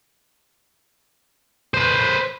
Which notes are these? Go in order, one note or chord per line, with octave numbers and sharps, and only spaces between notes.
B4 C5